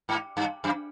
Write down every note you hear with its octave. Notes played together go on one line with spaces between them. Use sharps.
G#2
G2
F#2